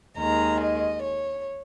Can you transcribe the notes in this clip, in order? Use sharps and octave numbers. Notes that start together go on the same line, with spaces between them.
D#2 D#3 G#3 A#5
D#5
C#5